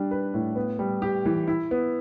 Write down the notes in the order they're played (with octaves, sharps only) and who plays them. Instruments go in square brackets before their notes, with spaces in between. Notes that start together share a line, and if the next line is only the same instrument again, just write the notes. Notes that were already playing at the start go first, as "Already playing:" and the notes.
Already playing: [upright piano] G3 D4
B4
A2
B3
G3
G4
E3
E4
B3